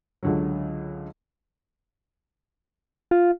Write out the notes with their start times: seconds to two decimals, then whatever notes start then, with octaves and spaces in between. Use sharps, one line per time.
0.23 C#2 D3 F#3
3.11 F4